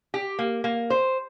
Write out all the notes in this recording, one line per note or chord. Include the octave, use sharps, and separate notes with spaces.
G4
A#3
A#3
C5